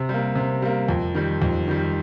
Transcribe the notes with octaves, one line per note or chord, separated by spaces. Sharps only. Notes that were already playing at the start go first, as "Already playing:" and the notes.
Already playing: C3
G3 A#3
C3
G3 A#3
F2
D#3 G3
F2
D#3 G3